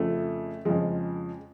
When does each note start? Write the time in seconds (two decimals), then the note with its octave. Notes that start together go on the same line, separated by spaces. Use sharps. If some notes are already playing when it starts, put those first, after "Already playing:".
Already playing: F2 C#3 F3 A3
0.65 F2 C#3 F3 G#3